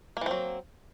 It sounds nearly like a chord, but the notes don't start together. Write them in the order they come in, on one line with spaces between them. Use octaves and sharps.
A#3 E3 C4 F#3